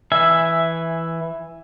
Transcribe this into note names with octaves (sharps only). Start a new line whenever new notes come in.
E3 E5 G#5